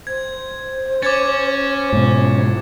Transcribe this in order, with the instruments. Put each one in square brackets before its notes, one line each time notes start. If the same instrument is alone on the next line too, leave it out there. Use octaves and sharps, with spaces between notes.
[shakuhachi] C5 [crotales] G#6
[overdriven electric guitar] C#4 [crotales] D6 G#6 A6
[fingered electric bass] G#2 B2